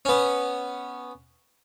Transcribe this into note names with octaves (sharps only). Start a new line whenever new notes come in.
B3 C#4